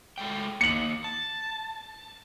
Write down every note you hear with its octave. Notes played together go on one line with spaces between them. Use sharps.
G#3 A3 G5
A#3 D#4 C#7 F#7
A5